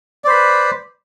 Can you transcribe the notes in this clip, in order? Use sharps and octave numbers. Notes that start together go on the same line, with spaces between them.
B4 C5 D5 B5